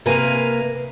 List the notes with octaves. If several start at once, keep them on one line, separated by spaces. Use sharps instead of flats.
C3 A#3 A#4 B4 F5 G#5